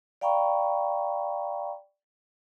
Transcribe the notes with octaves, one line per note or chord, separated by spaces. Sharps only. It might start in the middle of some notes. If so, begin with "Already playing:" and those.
D5 F5 G5 A#5 B5 C#6